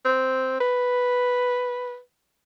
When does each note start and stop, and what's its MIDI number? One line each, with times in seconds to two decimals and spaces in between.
0.05 0.58 60
0.60 1.98 71